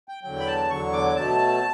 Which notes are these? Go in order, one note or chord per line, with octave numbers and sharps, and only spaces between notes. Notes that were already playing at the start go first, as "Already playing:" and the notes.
G5
E2 D3 F#3 G5
B5
A5
E2 D3 F#3 C#6
D6
B2 F#3 A3 A5